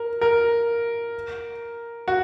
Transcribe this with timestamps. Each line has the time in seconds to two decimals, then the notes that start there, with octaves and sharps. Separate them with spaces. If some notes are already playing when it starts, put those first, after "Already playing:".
Already playing: A#4
0.21 A#4
2.08 F#4